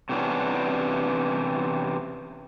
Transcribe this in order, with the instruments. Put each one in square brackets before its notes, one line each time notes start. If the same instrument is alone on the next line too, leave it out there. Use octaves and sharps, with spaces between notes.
[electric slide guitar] C3 E3 G3 B3 C#4 D4